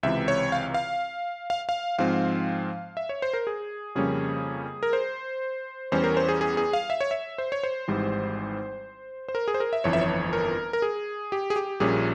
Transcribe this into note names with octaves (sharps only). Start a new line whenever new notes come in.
C#2 C3 E3 E5
C#5
F5
F5
F5
F5
G#2 F3 C4 F5
E5
C#5
C5
A#4
G#4
F2 C#3 G3 A#3 C#4 G#4
A#4
C5
E2 E3 G3 C#4 C5
A#4
C5
G#4
G#4
G#4
F5
E5
C#5
E5
C5
C#5
C5
G#1 G#2 E3 G3
C5
A#4
G#4
C5
A#4
E5
G1 F2 E3 C#5
E5
C#5
A#4
A#4
G#4
G4
G#4
G4
A#1 A#2 G3 C#4 G#4